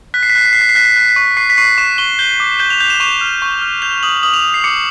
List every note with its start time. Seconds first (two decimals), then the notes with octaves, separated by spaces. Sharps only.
0.14 F#6 B6
0.23 C7
0.30 B6
0.35 F#6 C7
0.46 B6
0.53 F#6 C7
0.61 B6
0.69 C7
0.75 F#6 B6
0.85 C7
0.92 B6
0.96 F#6 C7
1.09 B6
1.16 C#6
1.37 C#6 C7
1.50 B6
1.57 C#6 C7
1.78 C#6 E7
1.98 C#6 G7
2.19 G6 G7
2.40 D6
2.60 G6 G7
2.70 F7
2.80 G6 F7
2.90 E7
3.00 C#6 F7
3.21 F6
3.42 C#6
3.61 F6
3.82 G6 F7
4.03 D#6 F#7
4.23 D#6 F#7
4.34 F7
4.44 D#6
4.54 C7
4.64 D6 C#7